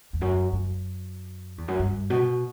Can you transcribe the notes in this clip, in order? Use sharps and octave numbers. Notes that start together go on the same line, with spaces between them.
E2
F#2
F#2
E2
F#2
G2
B2